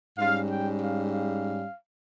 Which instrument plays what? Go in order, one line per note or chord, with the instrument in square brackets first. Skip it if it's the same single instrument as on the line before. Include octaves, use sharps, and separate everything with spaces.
[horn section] G#2 G3 C#4 F5
G5
F5
F5